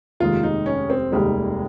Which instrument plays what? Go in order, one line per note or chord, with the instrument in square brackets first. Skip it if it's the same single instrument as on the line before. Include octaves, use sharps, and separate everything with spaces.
[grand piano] F1 D#2 D#3 G#3 [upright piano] F4
[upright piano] D#4
C#4
C4
[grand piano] F1 D#2 D#3 G#3 [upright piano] G3